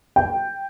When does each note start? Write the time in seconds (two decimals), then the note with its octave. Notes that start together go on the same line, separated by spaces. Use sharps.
0.16 G5